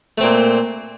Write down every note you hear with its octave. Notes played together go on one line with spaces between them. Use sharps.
A#2 A3 C4